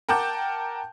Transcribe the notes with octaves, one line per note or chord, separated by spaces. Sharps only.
A#4 F#5 G5 A5 D6 G6